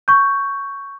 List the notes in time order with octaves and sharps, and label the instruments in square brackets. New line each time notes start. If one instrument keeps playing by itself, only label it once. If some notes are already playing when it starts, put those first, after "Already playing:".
[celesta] C#6 G6